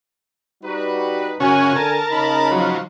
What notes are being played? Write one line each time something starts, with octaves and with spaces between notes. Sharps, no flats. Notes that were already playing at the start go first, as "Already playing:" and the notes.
G3 D#4 F#4 B4
F#2 C#3 C#4 F#4 G#5
D3 A#4 A5
C#3 D#4 B5
F3 F#3